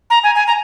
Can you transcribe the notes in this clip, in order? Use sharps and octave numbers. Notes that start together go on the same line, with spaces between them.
A#5
G#5
G#5
A#5